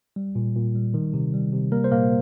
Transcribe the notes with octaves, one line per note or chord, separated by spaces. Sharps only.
G3
A#2
A#2
G3
D#3
C3
G3
C3
G3 A#3 A#4
C5
A#2 A#3 A#4